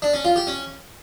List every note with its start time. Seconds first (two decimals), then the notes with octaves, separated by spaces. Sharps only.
0.02 D4
0.13 C#4
0.25 F4
0.36 G4
0.47 C#4